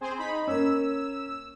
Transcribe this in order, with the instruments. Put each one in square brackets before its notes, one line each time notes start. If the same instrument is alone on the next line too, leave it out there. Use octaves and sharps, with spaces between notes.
[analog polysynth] C4 G#4 C5
D#4 B5
[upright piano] A#3 C#4 [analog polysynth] E6